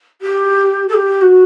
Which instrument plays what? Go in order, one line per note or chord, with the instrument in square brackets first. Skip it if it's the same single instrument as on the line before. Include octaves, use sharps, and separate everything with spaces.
[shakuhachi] G4
A4
G4
F#4